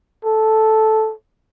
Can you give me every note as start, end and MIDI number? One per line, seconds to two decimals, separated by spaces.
0.25 1.13 69